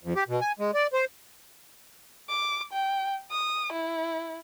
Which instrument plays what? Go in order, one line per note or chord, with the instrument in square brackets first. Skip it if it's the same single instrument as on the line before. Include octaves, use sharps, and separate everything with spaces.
[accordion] F2
G4
B2
G#5
G#3
D5
C5
[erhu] D6
G5
D#6
E4